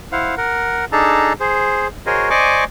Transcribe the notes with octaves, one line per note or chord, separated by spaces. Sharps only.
E4 C5 F5 F#5
A#4 F#5
D4 D#4 G#4 A4 A5 A#5
G#4 C5
F#4 G#4 A#4 C5 C#5 D#5
C5 D5 D#5 G#5 C#6 D6